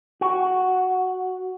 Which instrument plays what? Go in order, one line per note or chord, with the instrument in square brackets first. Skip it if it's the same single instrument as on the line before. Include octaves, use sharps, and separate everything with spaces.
[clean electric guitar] F#4